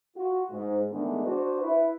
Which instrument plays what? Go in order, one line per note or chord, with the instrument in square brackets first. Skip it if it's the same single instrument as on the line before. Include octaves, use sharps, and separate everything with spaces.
[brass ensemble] F4 F#4
G#2
D#3 E3 G#3 A3 B3 D4
D4 F#4 C5
E4 B4